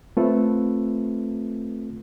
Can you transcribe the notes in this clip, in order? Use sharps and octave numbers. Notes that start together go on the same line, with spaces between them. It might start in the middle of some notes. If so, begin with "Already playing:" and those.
A3 C4 F4 A4 B4